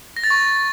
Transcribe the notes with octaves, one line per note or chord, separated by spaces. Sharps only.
A#6
A6
C#6